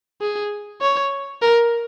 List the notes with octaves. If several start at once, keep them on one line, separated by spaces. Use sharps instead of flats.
G#4
C#5
A#4